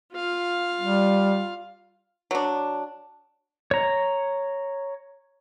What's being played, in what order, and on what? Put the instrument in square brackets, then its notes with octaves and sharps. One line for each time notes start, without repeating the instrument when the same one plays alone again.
[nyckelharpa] F4 F5
[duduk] G3
[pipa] F#3 D4
[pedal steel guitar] C#5 A#5